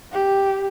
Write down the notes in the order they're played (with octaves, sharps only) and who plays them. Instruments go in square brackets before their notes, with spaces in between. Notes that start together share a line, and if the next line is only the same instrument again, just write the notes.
[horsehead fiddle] G4